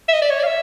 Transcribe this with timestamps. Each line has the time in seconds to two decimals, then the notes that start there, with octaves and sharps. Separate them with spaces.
0.08 E5
0.13 D#5
0.22 D5
0.30 C#5
0.39 D5
0.43 F5
0.47 E5